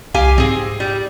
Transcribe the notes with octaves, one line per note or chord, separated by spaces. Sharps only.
C2 G4 F5 G#5
G#2 C4 G#4
G3